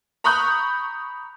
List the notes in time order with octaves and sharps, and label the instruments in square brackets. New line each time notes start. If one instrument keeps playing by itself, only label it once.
[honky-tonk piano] A#5 B5 C#6 D#6 F#6 G6